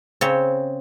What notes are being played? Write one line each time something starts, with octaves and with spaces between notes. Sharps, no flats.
C#3 C4 C#5